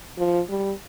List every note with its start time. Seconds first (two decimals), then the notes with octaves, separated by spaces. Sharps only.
0.18 F3
0.49 G3